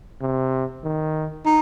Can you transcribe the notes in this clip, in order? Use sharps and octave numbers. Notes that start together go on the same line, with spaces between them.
C3
D#3
D#4